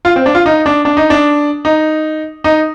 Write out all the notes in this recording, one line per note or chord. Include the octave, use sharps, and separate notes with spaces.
F4
C4
D4
F4
D#4
D4
D4
D#4
D4
D#4
D#4